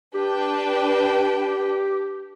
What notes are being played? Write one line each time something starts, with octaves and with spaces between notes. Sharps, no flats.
D4 G4 B4 G5